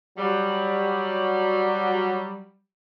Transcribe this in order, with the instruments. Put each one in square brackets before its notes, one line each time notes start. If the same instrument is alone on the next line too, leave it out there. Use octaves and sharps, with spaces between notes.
[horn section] F#3 G3